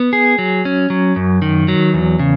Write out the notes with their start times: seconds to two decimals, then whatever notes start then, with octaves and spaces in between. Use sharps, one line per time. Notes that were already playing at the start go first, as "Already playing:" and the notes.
Already playing: B3
0.13 G#4
0.39 F#3
0.65 C#4
0.90 F#3
1.16 F#2
1.42 D#3
1.68 F#3
1.94 E2
2.19 C#3